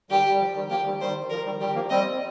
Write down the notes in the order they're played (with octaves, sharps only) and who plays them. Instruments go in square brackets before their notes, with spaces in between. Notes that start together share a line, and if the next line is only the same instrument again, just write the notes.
[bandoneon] D#3 G3 [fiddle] G4
[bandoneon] G3
F3
D#3 G3
[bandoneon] F3 A#3 [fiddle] G4
[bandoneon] D#3 G3
[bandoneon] D#3 G3 [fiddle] C5
[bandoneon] F3 [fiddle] A#4
[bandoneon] D#3 G3
[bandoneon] D#3 G3 [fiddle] G4
[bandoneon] F3 A#3
[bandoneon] G3 C4 [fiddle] D#5